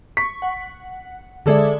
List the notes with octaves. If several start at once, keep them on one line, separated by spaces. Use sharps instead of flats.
C#6 B6
F#5
D3 G#3 G#4 A4 D5 E5